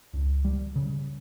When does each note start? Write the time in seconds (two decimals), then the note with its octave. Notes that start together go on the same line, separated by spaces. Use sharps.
0.13 C#2
0.45 G3
0.76 C#3